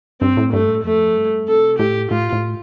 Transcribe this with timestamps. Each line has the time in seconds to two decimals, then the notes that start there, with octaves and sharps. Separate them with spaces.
0.21 G2 C4
0.37 A2
0.53 G2 A3
0.68 A2
0.84 F2 A3
1.16 G2
1.48 C3 A4
1.79 A2 G4
2.11 A2 F4
2.33 A2